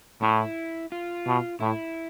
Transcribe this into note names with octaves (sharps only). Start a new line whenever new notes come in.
A2 E4
F4
B2
A2 E4